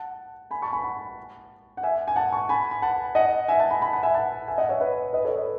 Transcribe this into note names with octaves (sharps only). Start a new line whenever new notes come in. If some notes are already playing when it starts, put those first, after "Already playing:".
Already playing: F#5 A5
G#5 B5
A5 C#6
G#5 B5
F#5 A5
F#5
E5 G#5
G#5
F#5 A5
A5 C#6
G#5 B5
B5
F#5 A5
D#5 F#5
E5 G#5
F#5 A5
G#5 B5
G#5 B5
F#5 A5
E5 G#5
F#5 A5
E5 G#5
D#5 F#5
C#5 E5
B4 D#5
B4 D#5
A4 C#5
B4 D#5